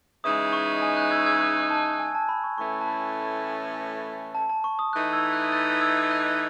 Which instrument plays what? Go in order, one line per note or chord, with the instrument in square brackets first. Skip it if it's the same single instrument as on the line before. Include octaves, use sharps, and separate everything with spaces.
[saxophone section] C#3 E3 G#3 D#4 [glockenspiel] D#6
[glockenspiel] C#6
G#5
F#6
E6 G#6
E6 G#6
F#6
A5
G#5
A5
B5
C#6
[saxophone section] A2 E3 A3 C#4 [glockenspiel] C#6
[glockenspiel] A5
B5
A5
A5
C#6
D#6
[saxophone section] E3 A3 D#4 [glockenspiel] F#6
[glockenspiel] E6 G#6
F#6
F#6 A6
E6 G#6
F#6